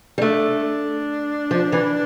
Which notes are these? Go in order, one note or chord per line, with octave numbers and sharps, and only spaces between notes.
G3
A3 D4
F3
E3